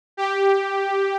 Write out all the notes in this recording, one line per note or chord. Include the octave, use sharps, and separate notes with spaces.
G4